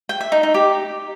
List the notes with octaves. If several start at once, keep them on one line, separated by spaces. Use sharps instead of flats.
G5
E5
D#4
D#4
G4